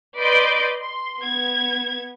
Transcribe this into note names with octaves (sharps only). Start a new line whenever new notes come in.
B4 D5 D#5 C6 G6 D7
C6
B3 G#6